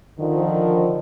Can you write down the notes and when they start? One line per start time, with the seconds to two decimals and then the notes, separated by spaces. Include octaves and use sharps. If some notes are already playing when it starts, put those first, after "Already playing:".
0.19 D3 D#3 F3